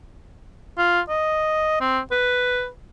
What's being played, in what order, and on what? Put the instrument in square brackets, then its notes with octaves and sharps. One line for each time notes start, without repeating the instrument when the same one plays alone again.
[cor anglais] F4
D#5
C4
B4